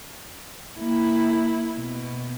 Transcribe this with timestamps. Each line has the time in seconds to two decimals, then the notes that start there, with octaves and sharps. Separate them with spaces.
0.77 A#3 E4
1.76 B2